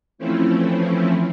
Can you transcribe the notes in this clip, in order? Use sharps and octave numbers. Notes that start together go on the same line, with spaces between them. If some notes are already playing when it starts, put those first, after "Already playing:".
E3 F3 A3 C4 C#4 E4